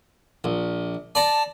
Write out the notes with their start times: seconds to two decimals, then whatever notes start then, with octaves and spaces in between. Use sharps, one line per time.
0.44 A#1
1.15 D5 A5 A#5